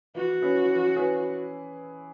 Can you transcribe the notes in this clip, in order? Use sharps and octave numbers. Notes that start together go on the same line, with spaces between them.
E3 F#4
C#4 E4 G#4 B4
E3
C#4 E4 G#4 B4